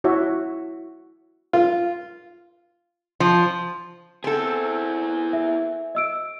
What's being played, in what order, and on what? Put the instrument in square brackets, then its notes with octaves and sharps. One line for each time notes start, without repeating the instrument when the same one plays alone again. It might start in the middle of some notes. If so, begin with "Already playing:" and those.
[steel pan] E4 F#4 C#5 E5
[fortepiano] F4
[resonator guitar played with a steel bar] F3
[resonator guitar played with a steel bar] C4 A4 [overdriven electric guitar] E4 G#4
[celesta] E5
D#5 E6 D7